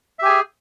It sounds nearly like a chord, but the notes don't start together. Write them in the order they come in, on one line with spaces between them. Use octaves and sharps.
E5 G4 G#5 G#4